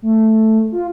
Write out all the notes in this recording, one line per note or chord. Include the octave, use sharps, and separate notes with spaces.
A3
F4